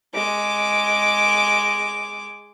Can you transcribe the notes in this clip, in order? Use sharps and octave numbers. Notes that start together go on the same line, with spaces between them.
G#3 D6